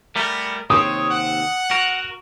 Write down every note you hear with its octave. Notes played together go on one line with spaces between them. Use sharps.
G3 A3 B3 A#4
D#2 C3 C4 C#5 D#6
F#5
F#4 A#4